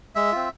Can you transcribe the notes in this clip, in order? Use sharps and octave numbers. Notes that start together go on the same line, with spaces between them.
G#3 E5
C4 F4